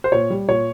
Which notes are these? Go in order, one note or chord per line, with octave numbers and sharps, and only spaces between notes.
C5
A#2 C#5
G3
A#2 C#5